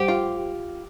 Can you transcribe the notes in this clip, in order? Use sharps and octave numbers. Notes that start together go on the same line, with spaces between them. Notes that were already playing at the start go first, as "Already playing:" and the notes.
Already playing: G4 C5
F4